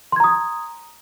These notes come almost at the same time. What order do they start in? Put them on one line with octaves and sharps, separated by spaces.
C6 G#6 A#5 D#6